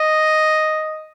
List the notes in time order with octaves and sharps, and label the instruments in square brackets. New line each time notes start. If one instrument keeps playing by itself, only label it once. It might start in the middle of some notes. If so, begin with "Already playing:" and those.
Already playing: [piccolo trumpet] D#5